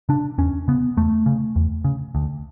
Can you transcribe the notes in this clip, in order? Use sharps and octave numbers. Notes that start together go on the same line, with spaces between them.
C#3 D4
E2 C#4
C#3 B3
E2 A3
C#3
E2
C#3
D2